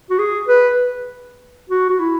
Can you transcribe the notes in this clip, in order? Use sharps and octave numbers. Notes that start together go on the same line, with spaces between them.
F#4
G#4
B4
F#4
F#4
E4